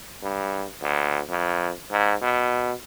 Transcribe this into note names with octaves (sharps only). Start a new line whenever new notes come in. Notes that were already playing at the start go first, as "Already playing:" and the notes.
G2
D2
F2
G#2
B2